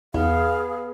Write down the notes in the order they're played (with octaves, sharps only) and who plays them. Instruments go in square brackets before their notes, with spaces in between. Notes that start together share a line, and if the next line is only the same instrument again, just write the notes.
[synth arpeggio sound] E2 [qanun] B3 [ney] G#4 [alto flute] F5